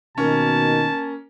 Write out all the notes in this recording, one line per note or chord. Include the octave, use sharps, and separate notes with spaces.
B2 D#3 A#3 C#4 A5